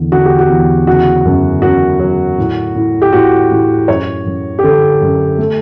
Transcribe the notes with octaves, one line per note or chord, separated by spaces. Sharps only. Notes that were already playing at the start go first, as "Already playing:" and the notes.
Already playing: E2 D3
D3 F#4
G4
F#4
E2
C#3 F#4
F#2
F#2 F#4
F#3
A2
A2
G4
A2 F#4
A2
F#2 C#5
F#2
G4
D3 A4
F#2
A3